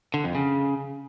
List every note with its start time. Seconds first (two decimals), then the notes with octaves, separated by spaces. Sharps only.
0.14 D3
0.24 F2
0.35 C#3